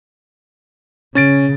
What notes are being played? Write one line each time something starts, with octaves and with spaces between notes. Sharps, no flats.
C#3 C#4 A6 D7